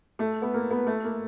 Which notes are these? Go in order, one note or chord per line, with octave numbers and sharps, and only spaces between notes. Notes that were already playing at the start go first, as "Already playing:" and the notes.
A3
B3
A#3
B3
A3
A#3